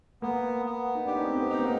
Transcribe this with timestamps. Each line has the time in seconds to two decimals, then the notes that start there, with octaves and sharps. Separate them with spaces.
0.22 A#3 B3
0.66 B3
0.95 D#4
1.05 D4 G4
1.16 C#4
1.25 C4
1.35 B3
1.50 D#4
1.59 B3
1.64 A#3